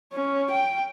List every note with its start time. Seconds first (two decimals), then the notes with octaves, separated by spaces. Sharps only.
0.13 C#4
0.51 G5